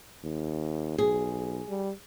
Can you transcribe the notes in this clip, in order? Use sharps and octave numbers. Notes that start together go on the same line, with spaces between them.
D#2
B1 G#4
G3